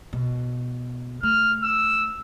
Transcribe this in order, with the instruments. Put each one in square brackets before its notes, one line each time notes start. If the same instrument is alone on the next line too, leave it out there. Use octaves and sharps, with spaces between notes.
[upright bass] B2
[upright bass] A3 [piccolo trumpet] F6
[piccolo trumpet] E6